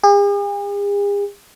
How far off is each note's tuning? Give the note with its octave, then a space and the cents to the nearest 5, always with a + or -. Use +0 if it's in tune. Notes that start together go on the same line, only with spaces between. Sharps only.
G#4 -45